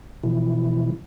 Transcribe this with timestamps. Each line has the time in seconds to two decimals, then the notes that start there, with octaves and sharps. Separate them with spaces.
0.24 B2 E3 F3 E4